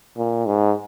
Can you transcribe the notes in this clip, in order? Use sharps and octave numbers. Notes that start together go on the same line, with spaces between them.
A#2
G#2